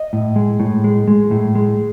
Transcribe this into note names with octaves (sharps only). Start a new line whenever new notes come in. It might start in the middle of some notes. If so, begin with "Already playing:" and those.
Already playing: D#5
A2
G#3
A2
G#3
G#3
A2
G#3